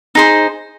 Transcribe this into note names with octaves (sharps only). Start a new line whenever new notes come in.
D#4 G#4 C5